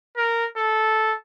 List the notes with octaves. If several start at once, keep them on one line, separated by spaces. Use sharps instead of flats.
A#4
A4